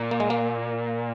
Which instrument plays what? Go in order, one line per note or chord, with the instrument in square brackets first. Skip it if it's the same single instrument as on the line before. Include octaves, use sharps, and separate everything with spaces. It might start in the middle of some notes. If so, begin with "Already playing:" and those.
Already playing: [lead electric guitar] A#2
[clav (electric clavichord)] A#3
G#3
A#3